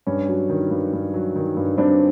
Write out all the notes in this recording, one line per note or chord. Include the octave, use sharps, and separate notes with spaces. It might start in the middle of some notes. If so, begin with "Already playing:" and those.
G2 C#4
F#3
D#3
G2
G2
F#3
D#3
G2
G2 C4 D4